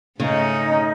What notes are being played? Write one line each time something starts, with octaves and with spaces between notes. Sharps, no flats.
G#2 C#3 A3 C#4 D#4